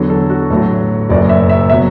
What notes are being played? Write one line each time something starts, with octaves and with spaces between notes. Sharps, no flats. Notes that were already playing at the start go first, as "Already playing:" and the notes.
Already playing: E2 D3 F#3
A4
F#4
A1 A2 F#3 A4
F#1 F#2 F#3 D5
E5
E5
B2 F#3 E5